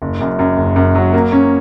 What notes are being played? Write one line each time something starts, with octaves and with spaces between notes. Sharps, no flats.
F#1
F#2
F#2
F#1
F#2
F#3
A#3
C#4